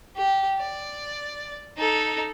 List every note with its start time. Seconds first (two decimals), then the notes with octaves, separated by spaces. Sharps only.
0.17 G4
0.59 D5
1.78 D#4 A4